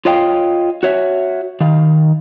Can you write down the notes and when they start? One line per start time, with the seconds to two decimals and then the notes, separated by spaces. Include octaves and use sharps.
0.05 F4 C#5 D#5 F5 G5
0.83 F#4 C#5 E5
1.61 D#3 F5